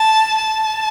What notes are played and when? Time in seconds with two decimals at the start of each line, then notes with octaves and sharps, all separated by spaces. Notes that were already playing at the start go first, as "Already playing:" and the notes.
Already playing: A5
0.37 A5